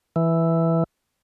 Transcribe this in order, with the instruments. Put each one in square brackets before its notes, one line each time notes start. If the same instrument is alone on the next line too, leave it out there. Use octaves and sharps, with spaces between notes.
[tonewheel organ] E3